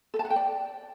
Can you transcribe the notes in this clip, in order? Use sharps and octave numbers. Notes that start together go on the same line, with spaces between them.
A4
A5
F#5
G5
D5